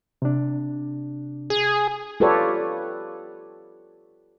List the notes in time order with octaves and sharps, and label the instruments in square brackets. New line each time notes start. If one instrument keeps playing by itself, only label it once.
[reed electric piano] C3 D4
[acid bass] G#4
[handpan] F4 G4 A4 B4 C#5 D5